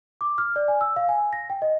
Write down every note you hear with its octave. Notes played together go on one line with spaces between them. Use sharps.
D6
F6
D5
G#5
E6
F5
G#5
A#6
G5
D#5